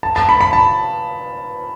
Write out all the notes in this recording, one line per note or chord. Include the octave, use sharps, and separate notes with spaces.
A5
A5
B5
B5
A5